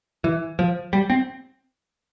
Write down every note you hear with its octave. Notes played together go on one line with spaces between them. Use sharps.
E3
F3
G3
C4